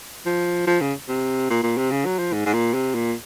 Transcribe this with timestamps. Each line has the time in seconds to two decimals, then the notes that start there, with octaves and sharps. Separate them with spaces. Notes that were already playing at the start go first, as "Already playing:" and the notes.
0.26 F3
0.67 F3
0.81 C#3
1.09 C3
1.50 A#2
1.63 A#2
1.78 C3
1.91 C#3
2.05 F#3
2.19 F3
2.33 G#2
2.46 G#2
2.53 A#2
2.74 C3
2.95 A#2